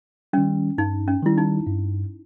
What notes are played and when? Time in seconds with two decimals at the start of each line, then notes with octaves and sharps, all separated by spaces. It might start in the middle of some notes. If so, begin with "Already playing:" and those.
0.33 D#3 G3 C#4
0.78 G2 D#4
1.08 C#4
1.22 D#3 G3 E4
1.38 D#4
1.67 G2